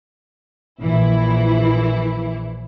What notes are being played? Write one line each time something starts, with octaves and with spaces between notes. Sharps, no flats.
A#1 E3 E4